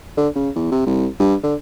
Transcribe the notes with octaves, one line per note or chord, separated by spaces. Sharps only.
D3
C#3
E2
C3
C2
G2
D3